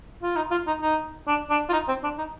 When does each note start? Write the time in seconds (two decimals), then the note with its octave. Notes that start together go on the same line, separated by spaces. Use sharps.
0.22 F4
0.36 D#4
0.51 F4
0.67 D#4
0.82 D#4
1.28 D4
1.50 D4
1.69 F4
1.73 D#4
1.88 C4
2.03 D4
2.18 D#4